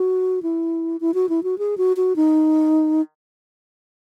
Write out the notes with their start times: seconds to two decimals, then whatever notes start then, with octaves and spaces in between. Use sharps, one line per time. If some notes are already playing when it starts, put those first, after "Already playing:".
Already playing: F#4
0.43 E4
1.01 E4
1.14 F#4
1.29 E4
1.43 F#4
1.58 G#4
1.78 F#4
1.97 F#4
2.16 D#4